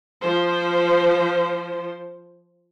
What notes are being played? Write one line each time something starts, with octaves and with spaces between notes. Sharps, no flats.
F3 C5